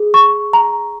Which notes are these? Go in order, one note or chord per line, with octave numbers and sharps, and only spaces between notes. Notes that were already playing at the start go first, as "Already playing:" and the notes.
Already playing: G#4
C#6
A#5